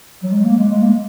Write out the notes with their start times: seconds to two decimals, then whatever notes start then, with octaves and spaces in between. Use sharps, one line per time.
0.23 F#3
0.32 G#3
0.44 A#3
0.57 G#3
0.69 G#3
0.82 A#3